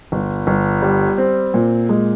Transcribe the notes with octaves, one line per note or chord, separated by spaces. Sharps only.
G1
G1
G3
C4
A#2
G#3